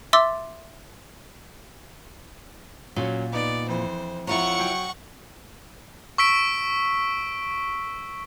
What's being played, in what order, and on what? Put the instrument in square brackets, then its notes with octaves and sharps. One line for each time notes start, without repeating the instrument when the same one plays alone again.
[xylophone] E5 C6 D6 E6 A6
[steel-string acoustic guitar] A#2 [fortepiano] F#3 C#4
[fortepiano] B3 D#4 [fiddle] D5
[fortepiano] F2 E3 [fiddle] C5
[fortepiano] F2 A#5 [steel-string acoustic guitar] E4 F4 C#5 [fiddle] F#5 C#6
[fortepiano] F#3 G5
[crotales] C#6 E6 B6 D7